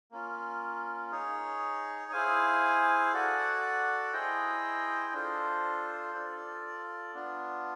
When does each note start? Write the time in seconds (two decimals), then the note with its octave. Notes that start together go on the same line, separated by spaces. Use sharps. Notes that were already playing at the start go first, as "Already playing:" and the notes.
0.11 A#3 C#4 F4
1.12 D#4 G#4 C#5
2.12 E4 G#4 C5 F5 G#5
3.13 F#4 A4 D5 F#5
4.13 E4 G#4 C5 D#5 G5
5.13 D4 F4 A4 C5
6.14 F4 A4 D5
7.14 B3 D4 F4